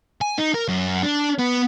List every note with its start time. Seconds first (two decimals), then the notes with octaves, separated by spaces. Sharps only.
0.21 G#5
0.38 D#4
0.55 A#4
0.68 F#2
1.03 D4
1.38 B3